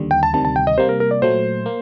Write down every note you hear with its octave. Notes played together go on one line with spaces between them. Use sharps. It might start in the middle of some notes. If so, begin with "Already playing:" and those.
Already playing: D#2 D3 G3
G5
A5
D2 C3 D#3 G3 A5
A5
G5
D#5
C3 G3 A#3 C5
A#4
A#4
D5
A#2 F#3 A3 C5
A#3